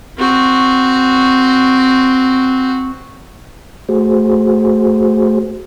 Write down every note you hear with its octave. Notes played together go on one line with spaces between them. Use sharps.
C4 F#4
A3 F#4 G#4 C5